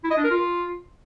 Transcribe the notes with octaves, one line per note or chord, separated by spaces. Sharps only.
E4
D#5
D4
A#4
F4